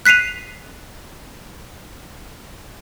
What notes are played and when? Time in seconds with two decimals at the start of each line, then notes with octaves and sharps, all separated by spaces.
0.05 F#6 B6 C7 D#7 F7